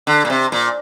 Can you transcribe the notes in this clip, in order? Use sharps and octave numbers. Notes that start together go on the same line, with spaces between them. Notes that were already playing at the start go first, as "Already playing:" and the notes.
D3
A#2
C3
A#2